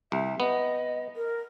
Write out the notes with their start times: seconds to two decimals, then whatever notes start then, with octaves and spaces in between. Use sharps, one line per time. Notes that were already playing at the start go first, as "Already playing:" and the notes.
0.12 C2 E5
0.40 B3 D#5
1.16 A#4